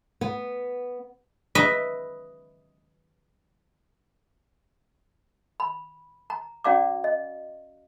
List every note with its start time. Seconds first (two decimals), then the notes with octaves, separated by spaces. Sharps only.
0.21 B3
1.55 B4 D#5 E5
5.60 B5
6.30 A#5
6.64 C#4 F#4 D5 F5 A#5 D6
7.04 D#5